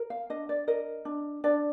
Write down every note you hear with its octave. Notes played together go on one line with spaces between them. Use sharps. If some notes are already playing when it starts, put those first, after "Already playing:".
Already playing: A#4
F5
D4 D#5
D5
A#4 D#5
D4
D4 D5